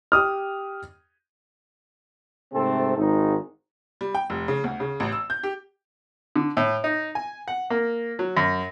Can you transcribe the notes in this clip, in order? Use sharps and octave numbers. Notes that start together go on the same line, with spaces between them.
G4 D#6 F6
G#2 C3 A3 C4 A4
G#1 G#2 D#4
G3
G5
F1
C#3
D2
C#3
A1
E6
G6
G4
D3
A2
D#4
G#5
F#5
A#3
F#3
F#2